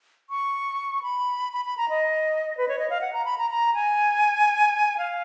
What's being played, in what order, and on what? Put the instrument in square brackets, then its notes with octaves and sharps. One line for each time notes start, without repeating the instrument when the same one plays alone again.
[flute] C#6
B5
B5
B5
A#5
D#5
B4
C#5
D#5
F5
F#5
A#5
B5
A#5
A#5
G#5
F5